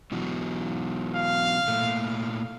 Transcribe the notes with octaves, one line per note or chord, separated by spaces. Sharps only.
B2 E3 F#3
F5
A#2 A3